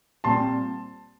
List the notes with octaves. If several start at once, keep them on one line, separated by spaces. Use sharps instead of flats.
A#2 G3 C4 A5 C6